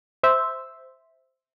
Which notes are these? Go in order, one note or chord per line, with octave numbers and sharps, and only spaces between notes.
C5 E5